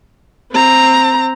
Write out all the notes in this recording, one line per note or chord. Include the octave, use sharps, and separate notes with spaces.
C4 A#5